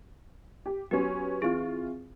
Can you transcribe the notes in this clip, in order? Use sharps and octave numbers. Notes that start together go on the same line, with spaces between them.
G4
F#3 B3 C#4 G4
E3 C4 F4 G#4